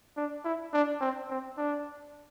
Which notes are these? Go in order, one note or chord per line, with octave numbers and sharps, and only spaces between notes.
D4
E4
D4
C4
C4
D4